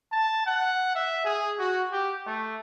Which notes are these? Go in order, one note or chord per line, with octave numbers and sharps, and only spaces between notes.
A5
F#5
E5
G#4
F#4
G4
A3